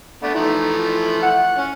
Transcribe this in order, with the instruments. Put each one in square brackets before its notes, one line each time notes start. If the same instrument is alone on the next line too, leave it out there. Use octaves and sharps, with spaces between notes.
[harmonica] A3 B3 D4 [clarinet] D5
[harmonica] E3 F3 A3 [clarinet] D#4
[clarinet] F4
F#5
[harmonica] C#4